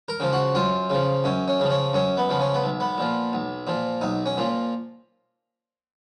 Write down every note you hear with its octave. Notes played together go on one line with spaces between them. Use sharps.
A#4
C#3 F3
F#4
F#2 F4
C#3 F3
F#2 C#4
C#4
C#3 F3
C#4
F#2 C#4
B3
C#3 F3
C#4
B3
B1
B3
A#2 F3
B1
A#2 F3
B1 D#4
C#4
A#2 F3